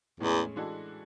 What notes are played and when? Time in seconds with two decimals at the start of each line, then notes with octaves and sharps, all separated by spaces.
0.20 E2 A2 G#3 C#4 G#4
0.56 E3 G#3 D4 F#4 A4